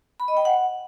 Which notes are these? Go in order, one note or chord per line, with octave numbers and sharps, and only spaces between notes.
B5
D#5
G5
F#5